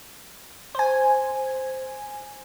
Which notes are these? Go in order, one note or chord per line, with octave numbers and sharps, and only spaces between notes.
C5 G#5